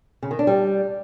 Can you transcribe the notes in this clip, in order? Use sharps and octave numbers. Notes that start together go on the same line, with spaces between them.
C#3
D#3
D4
G3